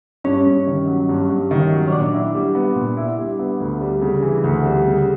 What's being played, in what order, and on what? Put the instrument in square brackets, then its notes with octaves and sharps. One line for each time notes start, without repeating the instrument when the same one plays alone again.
[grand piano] G2 [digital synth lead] C#4
[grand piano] G2
D#3
F#3
G2
G2
D#3
F#3
[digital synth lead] C#4
[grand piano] A#2 [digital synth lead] D4
[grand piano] E4
G3
B3
A#2
E4
G3
B3
D2
G3
C#3
E3
D2
G3
C#3